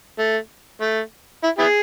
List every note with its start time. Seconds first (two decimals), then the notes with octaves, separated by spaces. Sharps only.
0.18 A3
0.81 A3
1.43 E4
1.59 B3 E4 G#4